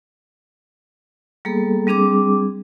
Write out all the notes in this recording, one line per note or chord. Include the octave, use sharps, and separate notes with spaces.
G3 A#3 B3 G#4 A4
G3 C4 D4 G#4 D6